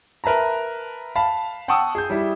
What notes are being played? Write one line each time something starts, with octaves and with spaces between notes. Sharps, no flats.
A#4 B4 E5 A5 A#5
F5 A5 B5
F#5 G5 A5 C#6 D#6 E6
G#4 G6
G3 E4